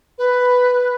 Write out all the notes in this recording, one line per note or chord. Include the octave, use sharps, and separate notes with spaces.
B4